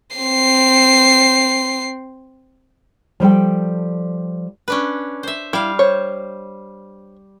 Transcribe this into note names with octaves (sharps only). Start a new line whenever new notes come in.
C4 C7
F3 G3 A4 G5
C#4 D4 B4
C5 E5
G3 E4 F5
C5 C#5